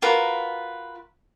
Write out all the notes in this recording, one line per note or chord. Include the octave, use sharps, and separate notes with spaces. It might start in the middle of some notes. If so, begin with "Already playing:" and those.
F4 F#4 A#4 B4